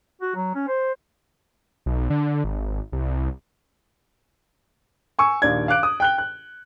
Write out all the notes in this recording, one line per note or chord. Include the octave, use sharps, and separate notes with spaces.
F#4
F#3
C#4
C5
B1
D3
G#1
C2
G#5 C#6 E6
A#1 D#2 D5 G#6
F5 D6 F#6 D7
D#6
G5 F#6 G7
F#6